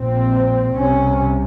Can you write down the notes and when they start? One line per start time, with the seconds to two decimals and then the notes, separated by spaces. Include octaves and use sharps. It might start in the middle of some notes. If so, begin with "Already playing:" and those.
Already playing: A#1 A#2 C4
0.74 C2 C3 C#4